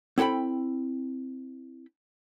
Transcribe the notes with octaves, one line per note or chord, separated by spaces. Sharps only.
C4 E4 A4 G5 B5